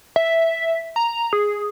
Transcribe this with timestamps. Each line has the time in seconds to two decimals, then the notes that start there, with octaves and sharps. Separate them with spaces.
0.16 E5
0.96 A#5
1.33 G#4